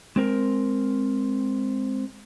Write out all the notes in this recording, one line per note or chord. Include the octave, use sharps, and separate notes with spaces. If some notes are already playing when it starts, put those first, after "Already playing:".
G#3 C4 A#4